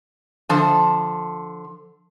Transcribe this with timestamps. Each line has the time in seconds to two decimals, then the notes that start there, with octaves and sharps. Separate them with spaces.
0.49 D3 F3 A5